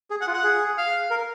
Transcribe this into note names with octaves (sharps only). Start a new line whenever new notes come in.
G#4
F#5
F4
F#5
G#4
F5
A#4